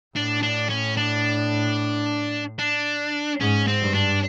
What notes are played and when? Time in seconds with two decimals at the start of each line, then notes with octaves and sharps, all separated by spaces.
0.16 A2 D4
0.43 D4
0.70 C#4
0.97 D4
2.59 D4
3.41 G#2 C#4
3.68 C4
3.81 G2
3.95 D4